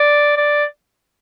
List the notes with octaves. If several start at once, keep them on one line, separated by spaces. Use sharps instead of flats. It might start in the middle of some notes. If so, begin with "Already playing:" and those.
Already playing: D5
D5